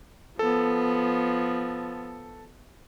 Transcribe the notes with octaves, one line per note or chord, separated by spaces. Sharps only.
F3 B3 A4